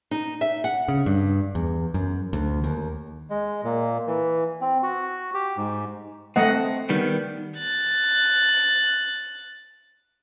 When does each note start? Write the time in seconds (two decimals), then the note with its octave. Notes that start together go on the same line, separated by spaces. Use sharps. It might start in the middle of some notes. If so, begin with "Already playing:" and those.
0.11 D#4
0.41 E5
0.64 F#5
0.88 C#3
1.06 G2
1.55 E2
1.94 F#2
2.33 D2
2.64 D#2
3.30 G#3
3.64 A#2
4.08 E3
4.61 C4
4.83 F#4
5.34 G4
5.57 G#2
6.36 A3 C4 D#5 F#5
6.89 D#3 G3 B3
7.58 F#6 A6